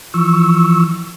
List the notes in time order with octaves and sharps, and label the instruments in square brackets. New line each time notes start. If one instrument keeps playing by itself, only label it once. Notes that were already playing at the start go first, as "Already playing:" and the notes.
[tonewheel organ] E3 F3 C#6 E6